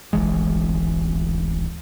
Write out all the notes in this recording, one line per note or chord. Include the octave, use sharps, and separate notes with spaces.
D1 G#1 E3 G#3